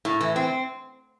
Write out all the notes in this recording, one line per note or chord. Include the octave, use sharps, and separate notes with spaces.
A2
E3
C4